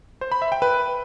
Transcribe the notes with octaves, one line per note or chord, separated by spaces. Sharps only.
C5
B5
E5
G5
B4